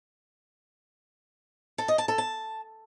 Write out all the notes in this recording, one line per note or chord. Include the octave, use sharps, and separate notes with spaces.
A4
D#5
A5
A4
A5